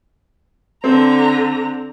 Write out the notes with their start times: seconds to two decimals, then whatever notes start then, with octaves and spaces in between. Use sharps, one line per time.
0.84 D3 C4 A4 A#5